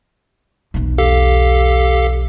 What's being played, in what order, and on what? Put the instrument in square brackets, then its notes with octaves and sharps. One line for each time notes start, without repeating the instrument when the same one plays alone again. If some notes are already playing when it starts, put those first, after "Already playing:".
[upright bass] B1 E2
[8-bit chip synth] G4 A4 F5